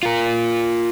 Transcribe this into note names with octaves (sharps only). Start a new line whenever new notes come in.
F4 A#4